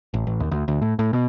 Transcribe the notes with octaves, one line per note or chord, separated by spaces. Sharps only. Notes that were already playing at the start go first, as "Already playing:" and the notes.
A1
A1
D#2
D2
D2
A2
A2
B2